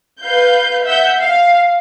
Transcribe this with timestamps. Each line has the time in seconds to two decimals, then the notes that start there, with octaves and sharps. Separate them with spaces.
0.21 B4 F5 G6
0.84 E5 F#5 G6
1.19 F5